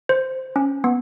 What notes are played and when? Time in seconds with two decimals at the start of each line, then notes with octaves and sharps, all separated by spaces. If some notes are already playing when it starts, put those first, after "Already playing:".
0.09 C5
0.56 C#4
0.84 B3